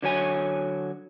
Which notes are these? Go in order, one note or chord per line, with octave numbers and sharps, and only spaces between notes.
D3 F#3 C#5 G#5